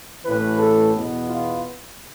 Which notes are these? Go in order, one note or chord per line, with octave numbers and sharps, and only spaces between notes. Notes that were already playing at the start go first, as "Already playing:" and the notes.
A1 A2 E3 B4
A4
E2 B2 B3
F4